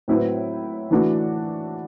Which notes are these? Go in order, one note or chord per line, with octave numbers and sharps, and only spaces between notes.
A2 F#3 C4 E4 B4
E3 A3 D4 F#4